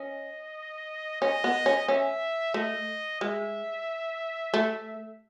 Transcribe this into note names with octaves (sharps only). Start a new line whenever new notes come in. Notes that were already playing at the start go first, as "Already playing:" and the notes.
Already playing: C#4 D#5
C#4 D#5
B3
C#4
C#4 E5
A3 D#5
G#3 E5
A3